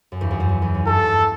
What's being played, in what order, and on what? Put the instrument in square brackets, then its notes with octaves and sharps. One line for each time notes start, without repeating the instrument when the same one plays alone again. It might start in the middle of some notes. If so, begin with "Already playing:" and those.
[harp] F#2
E2 G2
F#2
E2
F#2
E2
F#2
[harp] E2 G2 [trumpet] A4